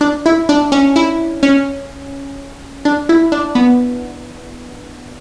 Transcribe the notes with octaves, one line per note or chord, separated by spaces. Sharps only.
D4
E4
D4
C#4
E4
C#4
D4
E4
D4
B3